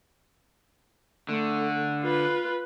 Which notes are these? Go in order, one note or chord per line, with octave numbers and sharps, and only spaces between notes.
D3 A3
F4 B4